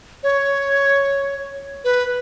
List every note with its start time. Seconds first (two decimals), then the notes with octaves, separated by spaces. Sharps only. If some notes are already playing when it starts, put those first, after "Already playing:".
0.23 C#5
1.84 B4